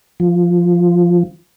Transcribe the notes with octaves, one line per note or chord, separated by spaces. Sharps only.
F3